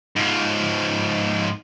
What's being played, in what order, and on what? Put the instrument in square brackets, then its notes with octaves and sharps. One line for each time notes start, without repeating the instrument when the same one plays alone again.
[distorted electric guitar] G#2 F3